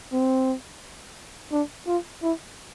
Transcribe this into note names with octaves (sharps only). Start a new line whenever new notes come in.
C4
D4
F4
E4